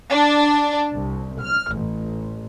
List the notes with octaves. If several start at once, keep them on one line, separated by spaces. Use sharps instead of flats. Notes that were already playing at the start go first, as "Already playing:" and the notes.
D4
C2
F6
A1